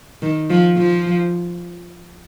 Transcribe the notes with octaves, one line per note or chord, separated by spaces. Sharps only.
D#3
F3
F3